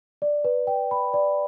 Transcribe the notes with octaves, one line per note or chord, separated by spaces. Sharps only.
D5
B4
G5
B5
D5